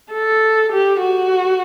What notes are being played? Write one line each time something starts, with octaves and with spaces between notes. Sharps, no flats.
A4
G4
F#4